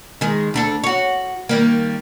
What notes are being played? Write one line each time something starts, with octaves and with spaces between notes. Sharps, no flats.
D#3 G#3 G#4
D2 D4 A4
F#4 C#5
D#3 G3 A#3